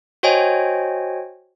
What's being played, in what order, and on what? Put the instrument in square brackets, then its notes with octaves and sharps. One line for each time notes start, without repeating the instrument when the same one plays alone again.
[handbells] F#4 C5 C#5 D#5 G5 G#5